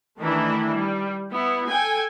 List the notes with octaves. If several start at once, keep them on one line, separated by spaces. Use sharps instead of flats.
D#3 E3 A3 D4 E4
G3
B3 E4
A4 G5 G#5